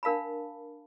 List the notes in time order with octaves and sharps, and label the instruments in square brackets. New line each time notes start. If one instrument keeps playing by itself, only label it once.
[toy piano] D4 A#4 F5 A5 B5